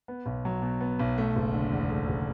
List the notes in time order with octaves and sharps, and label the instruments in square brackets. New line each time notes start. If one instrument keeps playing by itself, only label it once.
[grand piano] B3
B1
F#3
B2
B3
B1
A3
F#1
D3
E2
A3
F#1